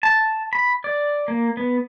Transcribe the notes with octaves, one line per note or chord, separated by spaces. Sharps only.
A5
B5
D5
A#3
B3